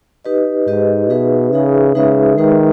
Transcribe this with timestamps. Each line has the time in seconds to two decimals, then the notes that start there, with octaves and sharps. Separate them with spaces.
0.25 D#4 G4 B4 D#5
0.67 G#2 D#4 G4 B4 D#5
1.10 B2 D#4 G#4 B4 E5
1.53 C#3 D#4 G#4 B4 E5
1.95 C#3 G#3 D#4 G#4 B4 E5
2.38 D#3 G#3 D#4 G#4 B4 E5